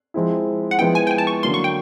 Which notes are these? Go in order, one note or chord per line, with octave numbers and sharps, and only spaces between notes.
F3 G#3 C4 E4
F#5
F3 G#3 B3 E4 G5
G#5
G5
G#5
A5
C#6
D3 F#3 A#3 C6
C#6
G5